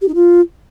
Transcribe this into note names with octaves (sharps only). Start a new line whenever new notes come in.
G4
D#4
F4